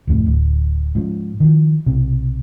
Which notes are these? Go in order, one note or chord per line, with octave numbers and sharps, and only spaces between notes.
D1 F2 A2
D1
G#2 F3
D#3 F3
B1 C3